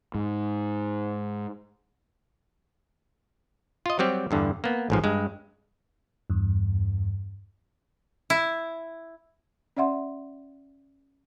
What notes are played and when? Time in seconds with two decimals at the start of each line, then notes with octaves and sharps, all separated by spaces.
0.14 G#2
3.86 F4 D#5
3.99 F#3 G3 C4 G4
4.31 E2 G2 D3
4.64 A#3 B3
4.90 A1 G#2 F3
5.04 G2 G#3
6.30 E2 G2
8.30 E4
9.77 C#4 D5 E5 F#5 C6